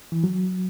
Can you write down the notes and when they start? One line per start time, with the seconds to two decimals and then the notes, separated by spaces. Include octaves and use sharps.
0.12 E3
0.24 F#3